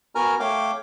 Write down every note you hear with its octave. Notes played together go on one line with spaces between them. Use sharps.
B3 F#4 A#4 G#5 A#5 F6
A3 C#5 F5 G5 D6